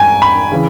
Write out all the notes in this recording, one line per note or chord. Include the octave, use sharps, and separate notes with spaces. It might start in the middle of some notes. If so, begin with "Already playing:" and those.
Already playing: G2 G5 G#5
B5
C#3 E3